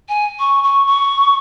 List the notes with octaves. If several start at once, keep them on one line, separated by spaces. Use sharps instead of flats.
G#5
C#6
C#6
C#6